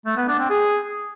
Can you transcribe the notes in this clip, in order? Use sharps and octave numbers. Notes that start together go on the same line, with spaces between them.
A3
B3
D4
C4
G#4